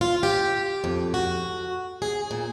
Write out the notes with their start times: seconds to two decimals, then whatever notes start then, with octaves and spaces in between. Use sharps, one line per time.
0.01 F4
0.23 G4
0.84 F2
1.14 F#4
2.02 G#4
2.31 A#2